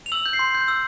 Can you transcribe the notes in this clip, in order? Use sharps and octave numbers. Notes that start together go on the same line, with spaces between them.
F7
E6 F#7
G6
C7
C6
G6
E6